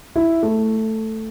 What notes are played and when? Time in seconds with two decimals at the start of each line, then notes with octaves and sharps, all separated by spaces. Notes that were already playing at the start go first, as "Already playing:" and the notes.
0.16 E4
0.43 A3